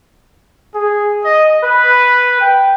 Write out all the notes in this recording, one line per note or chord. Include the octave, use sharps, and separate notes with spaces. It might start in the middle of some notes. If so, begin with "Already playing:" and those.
G#4
D#5
B4
G5